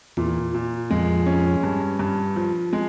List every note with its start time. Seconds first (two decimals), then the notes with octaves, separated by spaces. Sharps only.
0.17 E2 A#2
0.54 A#2
0.90 F2 G#3
1.26 C#4
1.63 G2
1.99 G2
2.36 F3
2.73 G#3